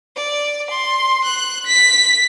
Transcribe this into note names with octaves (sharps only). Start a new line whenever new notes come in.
D5
C6
F#6
B6